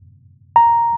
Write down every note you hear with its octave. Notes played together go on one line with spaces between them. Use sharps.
A#5